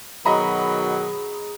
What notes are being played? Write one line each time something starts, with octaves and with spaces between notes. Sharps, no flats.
B2 D#3 F#3 G#4 D#5 A#5 B5